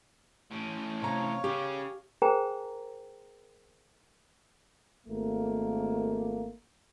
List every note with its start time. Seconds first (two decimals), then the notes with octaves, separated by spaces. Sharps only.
0.51 A2 C#4
1.02 C3 C#5 F5 A#5
1.44 C#3 C#4 G4
2.22 G#4 A#4 C5 G5 G#5 A#5
5.07 G#1 A3 A#3